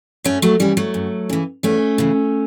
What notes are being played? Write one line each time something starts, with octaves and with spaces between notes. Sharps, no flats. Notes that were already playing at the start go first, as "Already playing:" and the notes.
F#2 A3 C#4
F#3 A3
C#3 E3 G3
F#3 A3
F#2
C#3 E3
E2 A3 C#4
C#3 E3